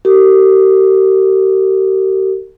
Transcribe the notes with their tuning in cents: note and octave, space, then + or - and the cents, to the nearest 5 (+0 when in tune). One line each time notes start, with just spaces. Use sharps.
G4 -40 A#4 -45